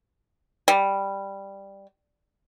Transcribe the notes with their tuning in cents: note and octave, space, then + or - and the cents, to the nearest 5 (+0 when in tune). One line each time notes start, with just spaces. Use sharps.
G3 +5